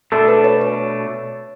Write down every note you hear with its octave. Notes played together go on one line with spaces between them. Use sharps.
B2 A3 D4 A4
B4
C#5
C#5